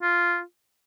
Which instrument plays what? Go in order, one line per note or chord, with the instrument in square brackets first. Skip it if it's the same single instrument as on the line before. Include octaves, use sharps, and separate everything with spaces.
[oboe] F4